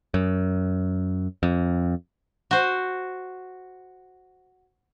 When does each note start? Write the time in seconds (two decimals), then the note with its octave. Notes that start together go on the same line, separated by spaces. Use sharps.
0.14 F#2
1.43 F2
2.51 F#4 C5